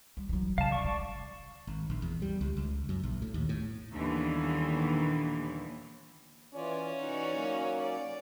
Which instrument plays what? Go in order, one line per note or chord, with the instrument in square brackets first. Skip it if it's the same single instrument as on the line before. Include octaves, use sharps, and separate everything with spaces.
[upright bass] G3
E3 F#3
[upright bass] C#3 [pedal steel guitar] F5 A5
[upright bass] C2 [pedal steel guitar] D5 C#6
[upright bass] G#3
[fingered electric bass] G#1
A#1
E2
G3
C#2
C#2
F#2
A#1
A2
D#2
A2
[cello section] D#2 A#2 D3 E3 G3 B3
[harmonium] E3 F4 D5 [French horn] C#4
[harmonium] E3 [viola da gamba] D#4 F#4 D5
[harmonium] F#3 A#3
[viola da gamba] D5